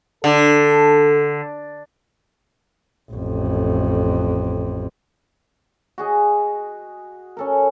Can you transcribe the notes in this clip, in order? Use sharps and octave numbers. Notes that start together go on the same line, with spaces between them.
D3 A4
A1 F2
F#4 G#4 D#5
C#4 A4 A#4